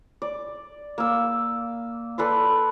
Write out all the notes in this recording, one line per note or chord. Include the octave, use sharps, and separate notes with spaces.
D5
A#3 E6
A4 B4 D5 C6